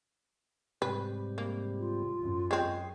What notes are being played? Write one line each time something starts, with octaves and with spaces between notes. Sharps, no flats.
G#2 C3 G3 B4
A#3
F4
F#2
G#3 C4 G#4